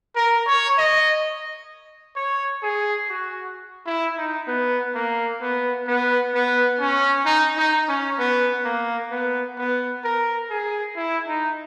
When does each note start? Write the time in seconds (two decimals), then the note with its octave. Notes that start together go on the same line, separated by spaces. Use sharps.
0.16 A#4
0.47 C#5
0.78 D#5
2.16 C#5
2.63 G#4
3.09 F#4
3.86 E4
4.17 D#4
4.48 B3
4.95 A#3
5.41 B3
5.87 B3
6.34 B3
6.80 C#4
7.26 D#4
7.57 D#4
7.88 C#4
8.19 B3
8.65 A#3
9.11 B3
9.59 B3
10.04 A#4
10.50 G#4
10.96 E4
11.28 D#4